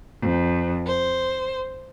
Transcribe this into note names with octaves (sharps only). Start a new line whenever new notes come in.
F2
C5